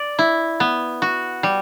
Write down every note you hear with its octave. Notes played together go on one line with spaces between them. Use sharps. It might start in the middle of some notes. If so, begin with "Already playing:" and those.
Already playing: D5
E4
B3
F#4
G3